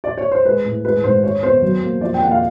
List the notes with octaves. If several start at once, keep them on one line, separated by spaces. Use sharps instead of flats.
D5
C#5
C5
G#3 B4
A2
G#3 B4
G#2 C5
G#3 C#5
B3 C5
F#3
A#3
F3 D5
G5
A#3 F#5
F5